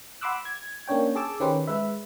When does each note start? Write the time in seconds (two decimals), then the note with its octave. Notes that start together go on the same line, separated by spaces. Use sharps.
0.21 F#5 B5 C6 D6 E6 F#6
0.45 G#6
0.88 A#3 C#4 D4 C#5 G5
1.15 G#4 A5 D6 E6
1.40 D#3 C#4 D#4 G4 B4 C5
1.67 G#3 B4 E5